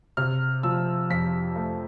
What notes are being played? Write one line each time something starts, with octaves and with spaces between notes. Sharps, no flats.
C3 F6
F3 E6
F2 B6
A3